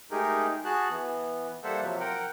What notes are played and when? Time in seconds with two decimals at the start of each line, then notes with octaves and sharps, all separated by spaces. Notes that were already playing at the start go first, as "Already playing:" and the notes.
0.11 G#3 A3 D#4 G4 G#4 A#4
0.65 F#4 G#4 A5 F#6
0.90 E3 B3
1.64 G3 A#3 A4 C5 E5 F#5
1.82 C3 F3 F#3
2.00 A#4 F#5 G5